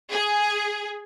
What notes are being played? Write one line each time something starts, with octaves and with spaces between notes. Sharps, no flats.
G#4